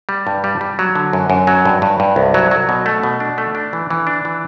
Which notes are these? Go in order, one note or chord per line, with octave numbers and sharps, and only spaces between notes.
G3
G2
G3
G3
F#3
D3
F#2
F#2
F#3
G2
G2
G2
C2
F#3
F#3
B2
A3
B2
D4
A3
D4
E3
E3
D4
E3